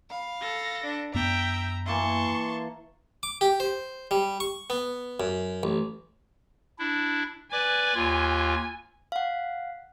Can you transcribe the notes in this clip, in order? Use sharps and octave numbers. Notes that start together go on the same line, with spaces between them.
F5 B5
A4 A#6
D4
F#2 B3 E5 G5 A#5
E3 A#3 E4 A5 C6 C#6
D6
G4
C5
G3
C#6
B3
F#2
A1
D4 E4
B4 D5 G#5 D6
D#2 F4
F5 F#5